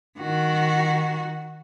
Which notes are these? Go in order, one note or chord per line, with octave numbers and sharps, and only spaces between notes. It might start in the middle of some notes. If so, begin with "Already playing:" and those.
D#3 F#4